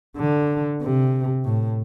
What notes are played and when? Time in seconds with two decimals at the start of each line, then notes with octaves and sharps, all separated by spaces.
0.17 D3
0.82 C3
1.45 A2